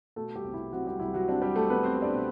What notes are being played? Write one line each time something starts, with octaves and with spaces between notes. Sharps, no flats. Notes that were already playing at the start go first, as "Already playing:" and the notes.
B2 A3 A4
G3 G4
C2
E4
F#3 C4 F#4
G3 G4
C2 E4
F#3 F#4
C4 D4
G3 G4
A3 A4
B3 B4
C4 C5
C5
D4 D5
B2